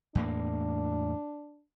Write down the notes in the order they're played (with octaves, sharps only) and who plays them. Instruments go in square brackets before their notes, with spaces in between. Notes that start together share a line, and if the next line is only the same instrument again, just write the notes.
[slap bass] E2 A2 A#3 [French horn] D4